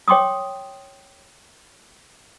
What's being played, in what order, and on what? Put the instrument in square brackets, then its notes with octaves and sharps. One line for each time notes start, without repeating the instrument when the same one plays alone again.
[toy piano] C#5 G5 C6 D6 D#6